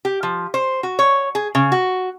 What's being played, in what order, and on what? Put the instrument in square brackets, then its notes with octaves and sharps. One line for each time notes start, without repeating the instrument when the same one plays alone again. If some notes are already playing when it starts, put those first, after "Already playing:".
[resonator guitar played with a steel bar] G4
F3
C5
F#4
C#5
G#4
C#3
F#4